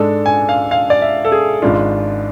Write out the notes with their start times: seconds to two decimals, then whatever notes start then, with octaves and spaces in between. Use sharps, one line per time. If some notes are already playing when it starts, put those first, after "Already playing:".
Already playing: G#2 G#3 D4 A4
0.26 G#5
0.49 F5
0.71 F5
0.90 D5
1.02 E5
1.25 A4
1.32 G#4
1.62 G#1 G#2 G#3 D4 F4